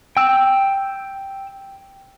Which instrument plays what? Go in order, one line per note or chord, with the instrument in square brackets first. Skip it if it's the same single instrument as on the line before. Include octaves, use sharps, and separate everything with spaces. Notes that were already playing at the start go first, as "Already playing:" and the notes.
[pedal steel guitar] G5 E6